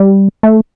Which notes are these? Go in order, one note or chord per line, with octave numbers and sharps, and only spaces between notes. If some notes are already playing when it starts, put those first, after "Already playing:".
Already playing: G3
A3